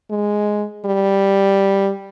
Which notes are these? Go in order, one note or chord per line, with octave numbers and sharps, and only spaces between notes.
G#3
G3